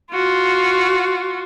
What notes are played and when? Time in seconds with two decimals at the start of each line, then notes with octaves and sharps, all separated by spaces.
0.12 F4 F#4